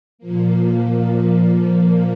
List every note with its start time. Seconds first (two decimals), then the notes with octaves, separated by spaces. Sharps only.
0.18 A#2 F3 A#3